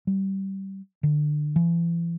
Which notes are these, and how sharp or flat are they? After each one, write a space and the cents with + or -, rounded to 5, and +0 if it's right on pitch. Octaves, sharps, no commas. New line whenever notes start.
G3 -20
D3 +25
E3 +40